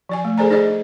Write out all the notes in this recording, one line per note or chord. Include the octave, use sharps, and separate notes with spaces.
F3 D5 G#5
A3
G#4 A4 C5 D5 G#5 A#5
D#4 G#4 A4 D5 D#5
D#4